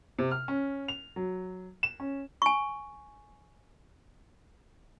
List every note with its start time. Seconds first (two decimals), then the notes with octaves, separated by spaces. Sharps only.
0.19 C3
0.31 F6
0.48 C#4
0.88 F7
1.16 F#3
1.83 E7
2.00 C#4
2.42 G#5 C#6